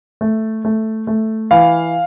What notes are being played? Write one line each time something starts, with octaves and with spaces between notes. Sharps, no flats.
A3
A3
A3
E3 F5